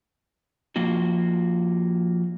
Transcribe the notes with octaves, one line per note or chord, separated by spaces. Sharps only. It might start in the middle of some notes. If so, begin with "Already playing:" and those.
F3 A#3 F4 F#4